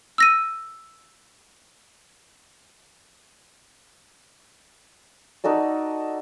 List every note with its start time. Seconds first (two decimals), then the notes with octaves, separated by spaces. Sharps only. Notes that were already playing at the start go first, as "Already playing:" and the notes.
0.18 E6 A#6 D#7
5.44 D#4 F#4 A4 D5